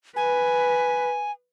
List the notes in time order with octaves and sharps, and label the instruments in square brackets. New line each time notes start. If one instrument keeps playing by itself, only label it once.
[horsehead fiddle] B4 [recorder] G#5